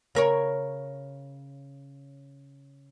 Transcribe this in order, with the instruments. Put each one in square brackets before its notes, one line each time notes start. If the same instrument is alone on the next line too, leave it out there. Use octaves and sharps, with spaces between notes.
[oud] C#3 A#4 C#5